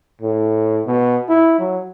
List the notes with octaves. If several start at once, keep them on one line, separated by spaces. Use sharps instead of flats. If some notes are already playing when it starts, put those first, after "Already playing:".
A2
B2
E4
F#3